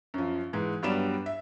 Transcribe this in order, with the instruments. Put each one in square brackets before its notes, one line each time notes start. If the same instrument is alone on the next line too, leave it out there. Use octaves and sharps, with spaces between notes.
[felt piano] F#2 F3
G#2 E3
G2 F#3 G3 B3 D5 E7
E5